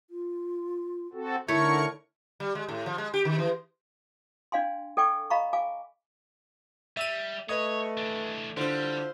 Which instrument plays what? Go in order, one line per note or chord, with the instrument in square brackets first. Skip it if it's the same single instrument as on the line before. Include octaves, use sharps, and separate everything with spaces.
[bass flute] F4
[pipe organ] C4 F#4 A4
[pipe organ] D3 A#4 C#6 [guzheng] A3 C#5 [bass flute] D#4 [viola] E4
[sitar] G3
G#3
A2
F3
G#3
G4
D#3
E3
[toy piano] D4 D5 F5 G#5 C6
A4 D5 G5 G#5 C#6 D6
D#5 F5 A#5 B5 C#6
F5 G#5 D6
[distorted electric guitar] G3 [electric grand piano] E5 E6 D#7
[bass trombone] A3 [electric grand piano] B4 D#5 D#6 [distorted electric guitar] C#5
[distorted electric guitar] E3 D4
[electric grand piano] D3 D4 [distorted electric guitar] G3 [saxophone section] E4 F4 C5